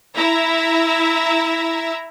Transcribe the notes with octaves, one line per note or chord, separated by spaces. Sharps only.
E4 E5 A#5